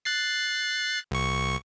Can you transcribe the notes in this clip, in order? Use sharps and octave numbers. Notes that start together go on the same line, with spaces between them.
F#6 A6 C7
C2 C#6